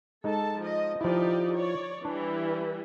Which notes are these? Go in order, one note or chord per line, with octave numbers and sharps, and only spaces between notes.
G#3 D#4 A4 A5
F3 D#5
F3 D#4 E4 G4 D5
C#5 D5
E3 G3 D4 E4